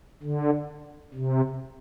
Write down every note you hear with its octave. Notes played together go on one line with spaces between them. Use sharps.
D3
C3